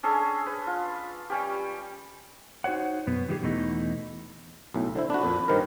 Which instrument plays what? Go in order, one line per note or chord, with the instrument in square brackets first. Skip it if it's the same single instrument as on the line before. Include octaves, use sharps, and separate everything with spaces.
[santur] C#4 D4 G#4 A4
B4
F4
G3 C#4 G4
[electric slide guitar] D#4 F#4 C5 C#5 F#5
F#2 B2 B3
D#3 G3 D#4 G4 G#4
E2 B2 E3 A3 D#4
[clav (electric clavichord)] B1 A2
[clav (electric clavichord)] D3 E4 [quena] C5
[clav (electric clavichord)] D4 F#4 [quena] B5
[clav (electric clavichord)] F2 A#2
[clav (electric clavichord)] G2 D#3 A#4 [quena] C5